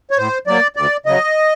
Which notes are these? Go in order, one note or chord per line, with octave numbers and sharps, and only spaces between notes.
C#5
A2 C5
F#3 A#3 D5
D2 D5
C#3 F#3 D#5